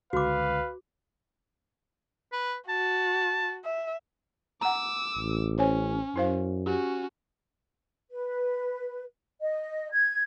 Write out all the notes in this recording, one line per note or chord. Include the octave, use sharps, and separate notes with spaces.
C#2 D3 F#4 B4 F5 D6
B4
F#4 A5
E5
F#5 A#5 D6 E6
A1
C#4 C5 C#5 G#5
F#2 E4 C5 F5
C#4 F#4 G4
B4
D#5
G#6